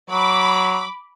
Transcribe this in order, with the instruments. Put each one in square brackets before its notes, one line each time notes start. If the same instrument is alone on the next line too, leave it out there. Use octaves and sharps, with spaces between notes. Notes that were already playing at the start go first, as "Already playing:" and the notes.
[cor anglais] F#3 [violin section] B5 D6